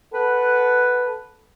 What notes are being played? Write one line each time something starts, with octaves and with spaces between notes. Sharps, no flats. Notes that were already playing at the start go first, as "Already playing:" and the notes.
A4 B4 F#5